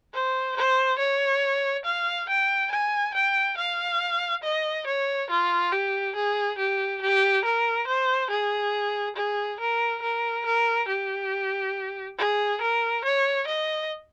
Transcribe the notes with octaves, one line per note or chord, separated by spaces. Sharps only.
C5
C5
C#5
F5
G5
G#5
G5
F5
D#5
C#5
F4
G4
G#4
G4
G4
A#4
C5
G#4
G#4
A#4
A#4
A#4
G4
G#4
A#4
C#5
D#5